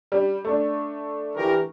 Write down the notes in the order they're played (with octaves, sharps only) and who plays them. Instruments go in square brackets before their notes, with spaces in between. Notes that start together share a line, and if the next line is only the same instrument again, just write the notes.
[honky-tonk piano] G3
A3 D4
[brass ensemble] E3 G4 A#4